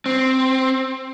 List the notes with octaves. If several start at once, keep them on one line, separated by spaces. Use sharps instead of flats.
C4